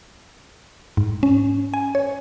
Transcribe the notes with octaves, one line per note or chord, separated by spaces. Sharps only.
G#2
C#4
G#5
C#5